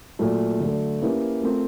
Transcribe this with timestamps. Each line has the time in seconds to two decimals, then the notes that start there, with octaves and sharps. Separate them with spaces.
0.19 A#2 F#3 A3
0.60 D3 F#3 A3
1.02 A#3 C#4 E4 G4 B4
1.43 A3 C4 F4 A#4